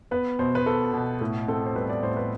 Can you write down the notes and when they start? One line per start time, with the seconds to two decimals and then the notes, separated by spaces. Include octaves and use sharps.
0.11 B3 B4
0.39 B2 C5
0.55 B4
0.66 B3 A4
0.94 B2
1.21 A2
1.48 C4 A4
1.66 C5
1.75 G3 B4
1.89 D5
2.03 A2 C5
2.16 B4